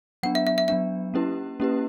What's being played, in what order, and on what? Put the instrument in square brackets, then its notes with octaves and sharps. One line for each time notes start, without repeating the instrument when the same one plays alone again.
[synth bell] F#3 B3 D4 [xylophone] F#5
[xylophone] E5
E5
E5
[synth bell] F#3 B3 D4 [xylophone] E5
[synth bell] A#3 C#4 E4 G4 B4
A#3 C#4 E4 G4 B4